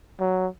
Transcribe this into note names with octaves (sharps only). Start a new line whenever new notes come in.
F#3